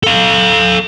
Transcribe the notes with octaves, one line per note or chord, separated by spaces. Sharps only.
A4 F5